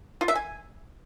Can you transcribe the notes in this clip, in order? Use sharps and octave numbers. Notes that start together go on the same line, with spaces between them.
F4
E5
G#5